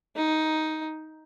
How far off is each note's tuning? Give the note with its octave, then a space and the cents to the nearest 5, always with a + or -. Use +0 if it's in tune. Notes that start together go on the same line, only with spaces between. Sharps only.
D#4 +10